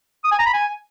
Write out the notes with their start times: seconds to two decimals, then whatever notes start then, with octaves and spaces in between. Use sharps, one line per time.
0.24 D#6
0.32 G#5
0.39 A#5
0.46 B5
0.53 G#5